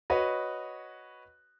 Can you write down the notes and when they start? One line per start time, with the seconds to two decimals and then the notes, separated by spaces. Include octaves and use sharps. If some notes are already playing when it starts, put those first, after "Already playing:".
0.10 F#4 B4 C#5 D#5